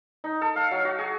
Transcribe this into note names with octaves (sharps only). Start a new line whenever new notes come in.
D#4
A4
F5
F#3
F#4
G#4